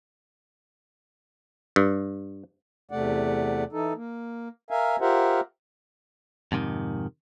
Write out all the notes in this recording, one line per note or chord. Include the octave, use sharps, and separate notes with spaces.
G2
E2 C3 A3 D5 F#5
E3 D#4 A4
A#3
A#4 E5 F5 G#5
F4 G4 A#4 C5 E5 F#5
F2 G#2 C3 D#3